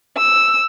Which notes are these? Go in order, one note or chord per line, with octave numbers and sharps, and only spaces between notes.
E6